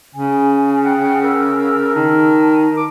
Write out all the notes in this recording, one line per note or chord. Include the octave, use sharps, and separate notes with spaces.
C#3 G#5
F#5 G5
A#4 E6
D#3 A5
D6